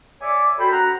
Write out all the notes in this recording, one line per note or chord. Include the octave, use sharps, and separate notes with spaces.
C#5 D5 E5 G#5 D6
F#4 A4 C5 G5 B5
C#4 F#4 F#5 A#5